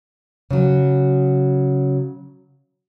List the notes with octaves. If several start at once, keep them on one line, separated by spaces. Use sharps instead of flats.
C#3 F#3